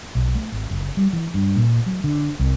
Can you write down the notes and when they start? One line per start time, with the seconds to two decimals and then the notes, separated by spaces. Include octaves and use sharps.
0.15 B1
0.35 A3
0.52 G#1
0.71 F#1
0.97 G3
1.13 E3
1.34 G2
1.56 A#2
1.86 F#3
2.04 D3
2.39 C2